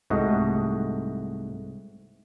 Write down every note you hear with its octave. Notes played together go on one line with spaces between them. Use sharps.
C2 G#2 A3 F#4 D#5